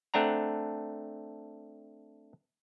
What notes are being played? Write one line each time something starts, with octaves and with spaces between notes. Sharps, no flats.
A3 C4 D4 F#5 A#5